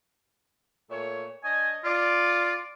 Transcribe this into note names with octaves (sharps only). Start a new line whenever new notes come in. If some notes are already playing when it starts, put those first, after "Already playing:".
A#2 A3 C#5
D4 C#5 D#5 G#5
F4 D5